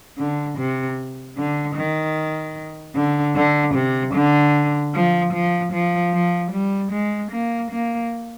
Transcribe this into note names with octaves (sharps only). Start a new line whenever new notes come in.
D3
C3
D3
D#3
D3
D3
C3
D3
F3
F3
F3
F3
G3
G#3
A#3
A#3